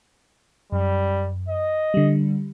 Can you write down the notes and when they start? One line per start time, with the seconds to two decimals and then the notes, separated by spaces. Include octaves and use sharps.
0.72 F#2 G3
1.48 D#5
1.94 D3 G3